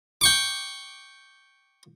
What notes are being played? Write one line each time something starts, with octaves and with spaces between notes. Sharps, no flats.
G5 C#6 D6